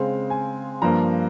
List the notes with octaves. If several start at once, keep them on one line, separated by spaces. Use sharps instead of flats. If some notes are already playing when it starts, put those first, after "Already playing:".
Already playing: C#3 G#3 C4 F5
G#5
G2 F3 A#3 A#5